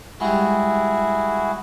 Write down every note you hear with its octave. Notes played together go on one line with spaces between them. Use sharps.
G3 G#3 E4 F#4 G#4